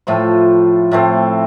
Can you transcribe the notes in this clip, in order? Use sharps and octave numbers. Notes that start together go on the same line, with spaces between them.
A2 F3 A3 F4
A2 A3 C4